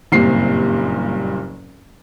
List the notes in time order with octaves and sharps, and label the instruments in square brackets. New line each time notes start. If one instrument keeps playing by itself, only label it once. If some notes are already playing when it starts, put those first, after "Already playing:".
[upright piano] F#1 G2 A#2 C4 C7